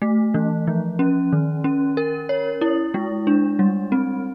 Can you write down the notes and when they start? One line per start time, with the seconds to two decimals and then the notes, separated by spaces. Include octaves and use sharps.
0.02 A3
0.34 E3
0.67 F3
0.99 C#4
1.32 D#3
1.64 C#4
1.97 A#4
2.29 C#5
2.61 E4
2.94 G#3
3.27 D4
3.59 G3
3.92 C4